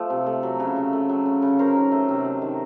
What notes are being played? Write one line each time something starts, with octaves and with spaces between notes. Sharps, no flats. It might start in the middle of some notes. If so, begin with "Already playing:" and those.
Already playing: F3 A3
C3
A3
F#3
C#3
C#3
A3
F#3
C#3
C#3
F#3 A#4 C5
D#3
A3
C3
F#3
D#3